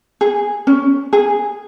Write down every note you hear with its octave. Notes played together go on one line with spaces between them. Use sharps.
G#4
C#4
G#4